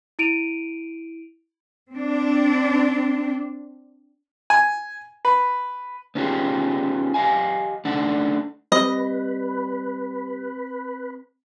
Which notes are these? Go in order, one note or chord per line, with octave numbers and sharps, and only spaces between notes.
E4 D7 D#7 F7
C4 D4
G#5
B4
B3 C#4 D#4 F4 G4 G#4
G4 D#5 F5 G#5
A3 D4 D#4 D5 F#5 A5
G3 C4 B4 D#5